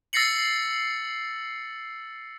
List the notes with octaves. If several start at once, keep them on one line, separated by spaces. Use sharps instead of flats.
E6 A6 A#6 C7 C#7 F#7